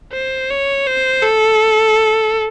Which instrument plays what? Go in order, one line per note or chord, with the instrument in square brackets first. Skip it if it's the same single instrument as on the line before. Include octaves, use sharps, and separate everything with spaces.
[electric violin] C5
C#5
C5
A4